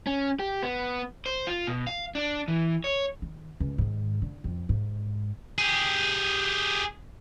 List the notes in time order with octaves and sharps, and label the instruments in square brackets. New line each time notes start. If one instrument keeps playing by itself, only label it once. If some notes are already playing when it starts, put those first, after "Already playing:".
[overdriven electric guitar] C#4
G4
B3
C5
F4
B2
F5
D4
E3
C#5
[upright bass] D#3
C#2
G#2 D#3
D3
F2
G#2
[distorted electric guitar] G4 G#4